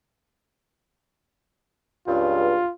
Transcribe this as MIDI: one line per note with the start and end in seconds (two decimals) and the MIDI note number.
2.08 2.59 37
2.08 2.59 43
2.08 2.71 65